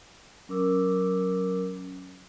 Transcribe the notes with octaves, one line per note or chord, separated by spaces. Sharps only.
F#3 C#4 A#4 D6 E6